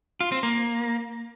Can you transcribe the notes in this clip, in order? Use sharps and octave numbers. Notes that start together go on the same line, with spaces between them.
F4
C4
A#3